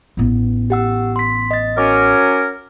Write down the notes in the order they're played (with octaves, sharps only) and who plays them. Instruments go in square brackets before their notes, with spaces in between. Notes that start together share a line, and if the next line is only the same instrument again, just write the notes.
[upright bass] A1 B3
[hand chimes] G4 F#5 E6
C6 B6
D#5 A6
[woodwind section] F#3 C#4 A#4 [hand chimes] D6